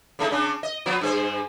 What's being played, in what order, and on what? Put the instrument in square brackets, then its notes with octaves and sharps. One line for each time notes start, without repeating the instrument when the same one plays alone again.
[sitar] C#3 G#3 D#4
C#3 C#4 D4
D#5
F3 B3 F4
G2 G#4 C5